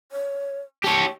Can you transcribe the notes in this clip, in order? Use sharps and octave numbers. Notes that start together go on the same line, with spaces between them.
C#5
G4 C#5 A5